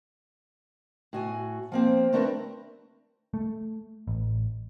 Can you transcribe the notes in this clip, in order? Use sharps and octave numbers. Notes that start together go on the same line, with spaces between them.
A2 F#4 G#5
F3 A#3 C4
A3 C4 D4 F#4 A#4 B4
A3
A1